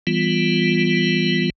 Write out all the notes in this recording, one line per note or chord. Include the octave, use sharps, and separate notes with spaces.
E3 G3 B3 F4